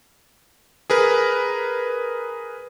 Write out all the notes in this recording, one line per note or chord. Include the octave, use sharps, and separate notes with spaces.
G#4 A#4 B4